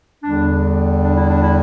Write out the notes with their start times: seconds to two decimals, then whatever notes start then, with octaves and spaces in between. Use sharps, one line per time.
0.23 E2 D3 G3 D4
1.03 D4
1.16 E4
1.29 D4
1.42 E4